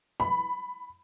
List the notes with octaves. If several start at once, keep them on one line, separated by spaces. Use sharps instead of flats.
B5